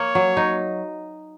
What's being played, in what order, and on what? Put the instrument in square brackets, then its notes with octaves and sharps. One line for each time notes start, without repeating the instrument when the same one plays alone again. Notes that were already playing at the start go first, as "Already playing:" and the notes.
Already playing: [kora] A#3 [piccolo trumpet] C#5
[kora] F#3
D#4